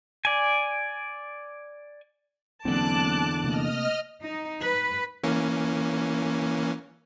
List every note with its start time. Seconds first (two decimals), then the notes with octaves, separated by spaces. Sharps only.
0.25 D5 G#5
2.65 E2 D3 F#3 A#3 C4 A5 D6 F#6
3.44 C3 A3 A#3 D#5 F6
4.23 D#4
4.62 B4
5.23 E3 A#3 C#4